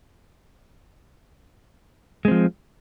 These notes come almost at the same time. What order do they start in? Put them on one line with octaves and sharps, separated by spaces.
G#3 C4 F3